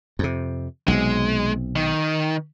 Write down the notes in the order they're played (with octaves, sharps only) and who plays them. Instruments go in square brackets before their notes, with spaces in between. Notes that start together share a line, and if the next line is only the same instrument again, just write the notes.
[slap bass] F2 C3
[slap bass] B1 C3 [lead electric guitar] G#3
[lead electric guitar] D#3